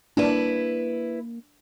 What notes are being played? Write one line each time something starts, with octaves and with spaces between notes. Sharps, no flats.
A#3 D4 E4 B4